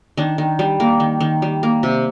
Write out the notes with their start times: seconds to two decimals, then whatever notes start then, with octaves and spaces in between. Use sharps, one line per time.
0.17 D#3 D4
0.38 D#3
0.59 G3
0.80 A#3
1.00 D#3
1.20 D#3
1.42 G3
1.63 A#3
1.83 C3